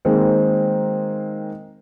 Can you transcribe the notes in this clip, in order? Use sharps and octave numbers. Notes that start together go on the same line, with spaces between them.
D#3 G#3 A#3 C4